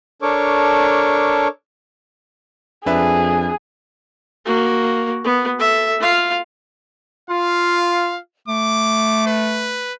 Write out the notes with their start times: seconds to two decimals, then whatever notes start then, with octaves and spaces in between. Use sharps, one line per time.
0.22 D4 A4 A#4 C#5 C#6 D6
2.86 F2 D4 G#4 B4 E5
4.45 A#3 F#4
5.24 B3
5.59 A4 E5
6.00 F4 F5
7.30 F4 F5
8.48 A3 D6
9.27 B4